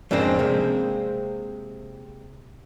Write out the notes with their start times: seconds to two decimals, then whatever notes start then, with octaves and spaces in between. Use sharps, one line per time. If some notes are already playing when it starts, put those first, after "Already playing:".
0.11 F2 G#2 C#3 A#3 C4 D4
0.39 C3 G#3 A#3 C4